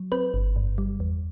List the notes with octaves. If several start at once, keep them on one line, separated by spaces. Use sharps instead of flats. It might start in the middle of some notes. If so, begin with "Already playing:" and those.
Already playing: F#3
C4 B4
G1
G2
G3
E2